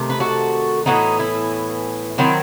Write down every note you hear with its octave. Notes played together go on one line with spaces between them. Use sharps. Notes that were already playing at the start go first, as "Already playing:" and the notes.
Already playing: C3 D#3 A3
B4
F#4 A4
A2 E3 B3 D#4 F#4
E4
D#3 F#3 C4 E4